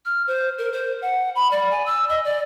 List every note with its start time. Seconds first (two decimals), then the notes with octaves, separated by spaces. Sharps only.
0.05 F6
0.27 C5
0.58 A#4
0.73 C5
1.02 F#5
1.36 B5
1.51 D5
1.71 G#5
1.86 E6
2.09 D#5
2.24 D5